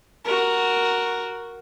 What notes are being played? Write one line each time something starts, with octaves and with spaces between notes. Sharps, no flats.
F#4 A#4